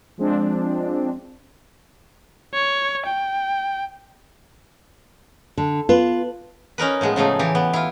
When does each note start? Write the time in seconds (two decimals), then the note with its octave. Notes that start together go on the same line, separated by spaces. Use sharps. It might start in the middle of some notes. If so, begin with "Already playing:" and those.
0.18 F3 G#3 C4 D4
2.54 C#5
3.06 G5
5.57 D3
5.89 B3 F4 B4
6.78 C#4 D#4 A#4 B4
7.01 A2 F3 G#3 B3
7.16 C#3 F3 A3 D#4
7.39 E3 G4
7.55 B3
7.73 E4 F4